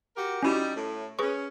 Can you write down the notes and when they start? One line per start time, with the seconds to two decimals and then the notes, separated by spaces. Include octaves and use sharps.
0.16 F#4 G4 A#4
0.43 G3 C#4 D#4 E4 F#4 G4
0.75 A2
1.19 C#4 G#4 B4 C#6